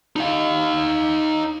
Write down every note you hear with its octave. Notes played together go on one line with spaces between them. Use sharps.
D#4 F5